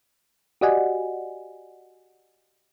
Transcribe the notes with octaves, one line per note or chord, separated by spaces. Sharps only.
F#4 G4 D5 D#5 F#5 G#5